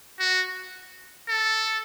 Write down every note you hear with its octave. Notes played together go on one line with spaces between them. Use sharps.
F#4
A4